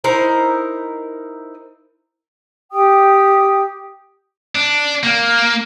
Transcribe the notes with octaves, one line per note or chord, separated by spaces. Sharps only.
D#4 E4 A#4 C5
G4 G5 D#6
D4
A#3